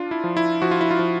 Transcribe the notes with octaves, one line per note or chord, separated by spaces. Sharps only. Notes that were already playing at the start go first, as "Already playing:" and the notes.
Already playing: D4 F4
E4
F3
E4
F3 F#4
F4
E4
F4
F3